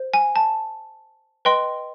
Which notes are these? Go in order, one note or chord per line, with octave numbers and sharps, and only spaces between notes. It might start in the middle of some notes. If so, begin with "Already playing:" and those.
Already playing: C5
G#5
A5
B4 D#5 G5 C6